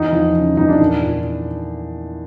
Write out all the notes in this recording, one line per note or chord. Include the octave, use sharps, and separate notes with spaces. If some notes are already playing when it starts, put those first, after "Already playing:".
Already playing: E2 D#4
F3
C#3
E2 D#4
D4
A#2
A#2